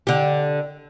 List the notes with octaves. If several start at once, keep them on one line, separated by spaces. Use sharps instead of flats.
D3 G4